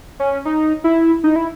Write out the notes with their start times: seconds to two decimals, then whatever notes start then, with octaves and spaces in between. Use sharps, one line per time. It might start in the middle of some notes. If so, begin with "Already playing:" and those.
0.20 C#4
0.45 D#4
0.84 E4
1.24 D#4
1.36 E4